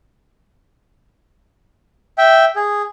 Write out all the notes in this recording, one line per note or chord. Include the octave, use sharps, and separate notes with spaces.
E5 G5
G#4